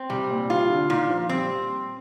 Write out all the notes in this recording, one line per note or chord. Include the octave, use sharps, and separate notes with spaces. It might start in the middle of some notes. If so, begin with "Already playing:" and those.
Already playing: C4
C3 G3
A#2
C3 F4
D3
A#2 D#3
F3
G3 C4